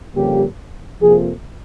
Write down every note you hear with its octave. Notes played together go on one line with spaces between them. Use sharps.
F2 C#3 G3 A#3 G4
F2 C3 F3 A#3 G#4